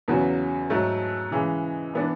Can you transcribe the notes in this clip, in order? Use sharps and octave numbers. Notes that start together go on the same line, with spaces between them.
E2 C#3 F#3 B3 F#4
G#2 F#3 A3
C#3 E3 G#3
E3 B3 D4